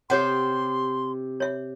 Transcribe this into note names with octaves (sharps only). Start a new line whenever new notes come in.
C3 C4 G4 C5 C#5 F#5 C6
C#5 E5